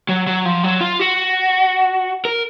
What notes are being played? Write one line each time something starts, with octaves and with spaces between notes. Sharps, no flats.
F#3
F#3
F3
F#3
F4
F#4
A#4